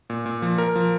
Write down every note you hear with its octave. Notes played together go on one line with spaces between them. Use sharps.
A#2
A#2
F3
A#4
F3